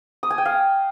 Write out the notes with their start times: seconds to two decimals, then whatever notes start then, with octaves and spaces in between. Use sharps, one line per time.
0.23 D#6
0.30 G#5
0.38 G5
0.45 F5